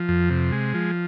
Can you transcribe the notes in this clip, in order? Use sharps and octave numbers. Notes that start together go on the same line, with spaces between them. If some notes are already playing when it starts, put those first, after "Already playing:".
Already playing: F3
F2
C3
G#3
F3